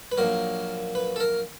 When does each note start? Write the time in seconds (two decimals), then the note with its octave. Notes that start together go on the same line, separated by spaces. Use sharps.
0.12 B4
0.18 A#1 A#2 F#3 A#4
0.95 B4
1.16 A4
1.20 A#4